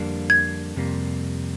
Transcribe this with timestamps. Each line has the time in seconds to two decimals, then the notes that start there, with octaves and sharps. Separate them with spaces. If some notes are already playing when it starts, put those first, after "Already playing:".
Already playing: F2 D3 G3 A#3 D4
0.30 G#6
0.76 F2 C3 G3 A#3